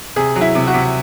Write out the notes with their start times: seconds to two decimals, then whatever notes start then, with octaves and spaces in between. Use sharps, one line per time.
0.16 C3 G#4
0.36 F#3
0.41 E4
0.55 C3
0.67 F#4
0.74 C3